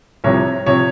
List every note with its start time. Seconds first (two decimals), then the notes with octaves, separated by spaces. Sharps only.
0.24 C2 C3 F3 C#5
0.66 C3 F3 C#5